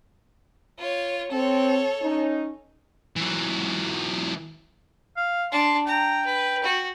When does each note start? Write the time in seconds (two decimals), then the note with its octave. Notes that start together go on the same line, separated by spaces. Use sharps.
0.79 F4 C#5
1.32 C4 A4 C#5
2.02 C#4 D#4
3.16 E3 F#3
5.16 F5
5.52 D4 A5 C6
5.87 G5 A#5
6.25 B4
6.63 F#4